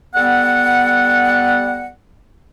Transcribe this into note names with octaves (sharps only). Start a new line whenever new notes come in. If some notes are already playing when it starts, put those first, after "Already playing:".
G3 B3 A4 F#5